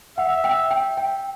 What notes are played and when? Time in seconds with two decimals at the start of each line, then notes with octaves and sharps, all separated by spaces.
0.18 E5 F#5
0.44 G5
0.71 G5
0.97 G5